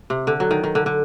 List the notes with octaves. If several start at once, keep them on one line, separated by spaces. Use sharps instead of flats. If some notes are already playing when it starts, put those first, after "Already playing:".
C3
D3
F#3
D#3
D#3
D3
D3